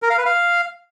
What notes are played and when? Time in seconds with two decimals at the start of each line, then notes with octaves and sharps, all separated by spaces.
0.02 A#4
0.10 F5
0.18 B4
0.26 F5